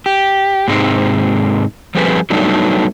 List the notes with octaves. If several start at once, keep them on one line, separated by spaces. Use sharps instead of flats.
G4
G#2 C3 G#3 C4 D#4
F3 G3 A3 C4 G#4 B4
F#3 G3 A3 B3 D4 D#4